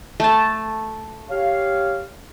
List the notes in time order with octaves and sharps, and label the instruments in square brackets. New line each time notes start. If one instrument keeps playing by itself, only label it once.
[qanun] A3 A5
[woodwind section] G4 C#5 F5